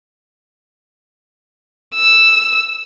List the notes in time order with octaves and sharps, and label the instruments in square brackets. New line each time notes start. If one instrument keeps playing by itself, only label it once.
[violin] E6